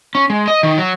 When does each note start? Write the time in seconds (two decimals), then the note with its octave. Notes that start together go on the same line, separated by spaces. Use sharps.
0.15 C#4
0.30 G#3
0.48 D#5
0.63 D#3
0.78 F#3